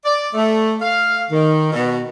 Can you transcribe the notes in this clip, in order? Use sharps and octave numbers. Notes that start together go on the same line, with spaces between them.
D5
A3
F5
D#3
B2